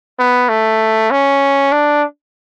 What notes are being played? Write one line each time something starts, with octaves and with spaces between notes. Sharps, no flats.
B3
A3
C#4
D4